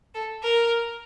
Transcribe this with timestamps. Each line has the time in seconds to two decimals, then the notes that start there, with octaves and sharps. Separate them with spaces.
0.15 A4
0.43 A#4